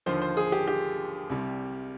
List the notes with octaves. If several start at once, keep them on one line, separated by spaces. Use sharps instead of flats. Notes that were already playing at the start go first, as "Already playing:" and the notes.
D#2 D3 F3 C5
C5
G#4
G4
G4
C2 C3 G3